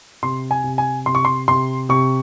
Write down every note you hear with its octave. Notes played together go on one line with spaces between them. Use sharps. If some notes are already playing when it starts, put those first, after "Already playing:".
C3 C6
G#5
C3
G#5
C3 C6
C#6
C6
C3 C6
C3 C#6